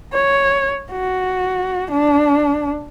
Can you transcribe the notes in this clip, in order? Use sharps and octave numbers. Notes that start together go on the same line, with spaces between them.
C#5
F#4
D4